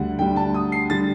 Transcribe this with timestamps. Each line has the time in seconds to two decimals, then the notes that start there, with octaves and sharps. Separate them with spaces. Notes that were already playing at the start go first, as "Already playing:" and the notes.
Already playing: D2 D3 G3 F#5
0.19 D2 D3 G3 G5
0.36 A5
0.54 D#6
0.72 C7
0.90 D3 G3 A6